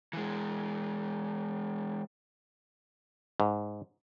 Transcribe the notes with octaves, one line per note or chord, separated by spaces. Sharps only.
E3 G#3
G#2